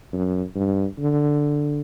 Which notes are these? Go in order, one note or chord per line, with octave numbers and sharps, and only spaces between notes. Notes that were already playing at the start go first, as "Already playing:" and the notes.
F#2
G2
D3